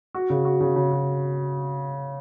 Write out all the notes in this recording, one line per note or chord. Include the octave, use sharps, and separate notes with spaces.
F#4
C#3
F#4
C#3
C#3
F#4